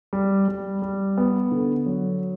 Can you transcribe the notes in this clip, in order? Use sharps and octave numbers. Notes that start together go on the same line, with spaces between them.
G3
G3
G3
B3
D3
F#3